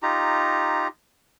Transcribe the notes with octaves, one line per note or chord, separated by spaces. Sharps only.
D#4 F4 G4 A#5